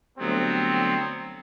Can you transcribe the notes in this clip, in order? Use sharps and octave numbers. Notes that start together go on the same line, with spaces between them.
D2 F#3 G3 B3 C4